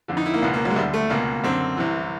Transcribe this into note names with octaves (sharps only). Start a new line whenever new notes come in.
F2 D3
D#4
E4
A#3
C#2 B2 B3
A#3
F#3
G#3
D2 D3 G3
A3
C#2 B2 A#3
F#2 D3 C4
C2 C3 E3